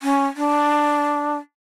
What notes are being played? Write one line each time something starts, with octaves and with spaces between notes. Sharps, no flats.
C#4
D4